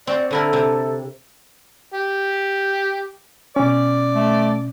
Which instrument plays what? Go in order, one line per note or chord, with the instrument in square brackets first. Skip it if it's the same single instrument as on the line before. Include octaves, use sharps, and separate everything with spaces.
[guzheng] C4 F#4 [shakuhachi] D5
[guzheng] D3 E4 A#4 [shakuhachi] A4
[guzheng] C3
[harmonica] G4
[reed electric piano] B2 C#4 [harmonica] D5
[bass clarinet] A3